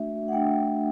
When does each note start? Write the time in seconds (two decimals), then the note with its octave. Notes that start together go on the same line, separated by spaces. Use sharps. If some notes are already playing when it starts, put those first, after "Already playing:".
Already playing: A3 D4 F#4 E5
0.28 F#5
0.32 A3 D4 F#4 G5